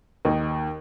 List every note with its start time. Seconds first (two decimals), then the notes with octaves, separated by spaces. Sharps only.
0.25 D#2 D#4